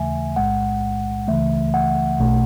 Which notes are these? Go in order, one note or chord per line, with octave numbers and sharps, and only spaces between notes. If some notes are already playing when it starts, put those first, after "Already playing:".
Already playing: D#2 C#3 E3 A3 E5 G#5
B1 A2 G#3 F#5
C#2 C#3 E3 A3 E5
F#5
B1 B2 A3